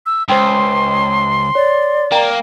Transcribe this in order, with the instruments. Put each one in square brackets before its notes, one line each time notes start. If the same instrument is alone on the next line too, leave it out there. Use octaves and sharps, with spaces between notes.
[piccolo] E6
[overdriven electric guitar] C#2 [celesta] C5 G5 [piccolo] C6
[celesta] C#5 [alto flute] D5
[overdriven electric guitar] A#3 [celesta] G5 A#5